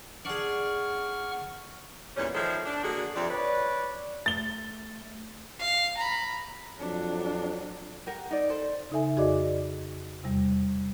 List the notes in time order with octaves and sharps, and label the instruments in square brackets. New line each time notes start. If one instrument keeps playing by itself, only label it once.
[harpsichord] D4 G#4 [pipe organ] F#5 C#6 F6
[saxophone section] E2 A#2 G3 C#4
D#3 F3 G#3 E4 A4 C5
D4
D3 A#3 F#4 G#4
F2 C3 D5
B4 C#5 D5
[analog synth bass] A3 [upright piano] A6 G7
[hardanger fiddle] F5
A#5 B5
[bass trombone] F2 [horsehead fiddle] F#3 D4
[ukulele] G4 A#4 F#5
D#4 D5
A4 C5
[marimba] C#3 D#4 A4 E5 G#5
F2 F#4 G#4 D5 D#5 D6
E2 C3 G3